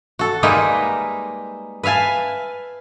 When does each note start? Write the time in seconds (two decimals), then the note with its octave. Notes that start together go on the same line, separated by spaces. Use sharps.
0.19 F#4 A4
0.43 G3 G#3 A#3 D#4 B4 E5
1.83 B4 E5 F5 G#5 A5